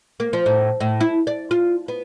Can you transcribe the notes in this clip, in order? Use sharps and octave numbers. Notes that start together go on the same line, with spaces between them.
A#3
F3
A2
A2
E4
D5
F4
B3